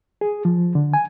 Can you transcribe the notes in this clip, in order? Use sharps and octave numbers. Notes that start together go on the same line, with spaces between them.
G#4
F3
D3
G#5